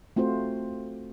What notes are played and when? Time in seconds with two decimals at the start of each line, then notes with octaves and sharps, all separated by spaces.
0.16 A3 C4 F4 F#4 C5